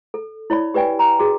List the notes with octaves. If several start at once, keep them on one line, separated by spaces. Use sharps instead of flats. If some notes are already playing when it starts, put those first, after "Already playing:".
A4
E4 C#5 D5 B5
G4 B4 D5 G5 G#5
A#5
F#4 G#4